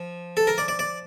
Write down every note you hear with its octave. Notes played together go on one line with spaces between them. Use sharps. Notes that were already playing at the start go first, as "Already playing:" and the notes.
Already playing: F3
A4
A#4
D5
D5
D5